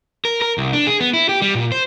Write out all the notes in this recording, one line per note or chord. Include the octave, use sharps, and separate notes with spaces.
A#4
A#4
C2
D4
G#4
B3
E4
G4
G3
A#2
C5